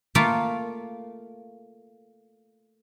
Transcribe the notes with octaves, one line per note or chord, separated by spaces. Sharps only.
A3 A#3 F4 A#4